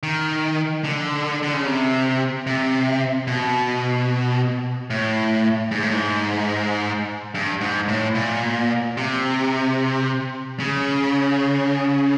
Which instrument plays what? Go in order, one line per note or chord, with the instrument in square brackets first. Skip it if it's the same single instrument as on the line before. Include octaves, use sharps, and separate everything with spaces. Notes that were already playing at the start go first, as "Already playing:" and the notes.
[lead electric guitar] D#3
D3
D3
C#3
C3
C3
B2
A2
G#2
A2
G#2
G2
G#2
A2
A#2
C3
C#3